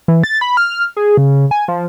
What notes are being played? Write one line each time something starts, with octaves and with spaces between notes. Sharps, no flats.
E3
A6
B5
F6
G#4
C#3
G#5
F3